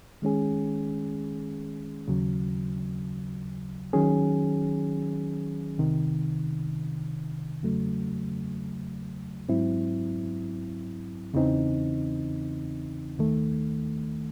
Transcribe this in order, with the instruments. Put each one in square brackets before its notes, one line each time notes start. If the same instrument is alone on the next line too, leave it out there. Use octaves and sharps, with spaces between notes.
[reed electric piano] D#3 G#3 C#4 G#4
D#2 C#3 F#3
D#3 F#3 C#4 G#4
C2 C3 D#3
E2 C#3 F#3 A3
G#2 F#3 C4 E4
E2 C#3 E3 C4 D#4
D#2 D#3 A3